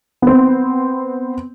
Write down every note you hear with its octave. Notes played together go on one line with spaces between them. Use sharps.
B3 C4